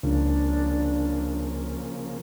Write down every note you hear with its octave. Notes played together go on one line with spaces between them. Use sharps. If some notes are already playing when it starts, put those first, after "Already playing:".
C#2 C#3 F3 A#3 D4